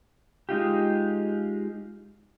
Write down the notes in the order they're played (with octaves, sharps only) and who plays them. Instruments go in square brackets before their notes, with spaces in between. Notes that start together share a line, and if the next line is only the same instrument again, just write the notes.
[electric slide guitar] G#3 D#4 F4 G4